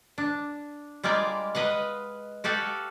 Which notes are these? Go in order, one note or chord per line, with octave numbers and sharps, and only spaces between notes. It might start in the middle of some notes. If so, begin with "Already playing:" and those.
D4
G3 G#3 A#3 F4 D5
B4 D#5 F5 F#5
F#4 G4 A4 F5 F#5